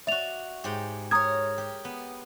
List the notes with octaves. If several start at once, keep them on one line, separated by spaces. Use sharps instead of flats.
F#4 D5 E5 F7
G#2 G4
A#4 C#5 A#5 D#6 G#6
G4
B3